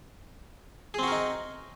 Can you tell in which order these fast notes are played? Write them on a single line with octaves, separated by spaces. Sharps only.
G#4 C4 F#4 A#4 D#4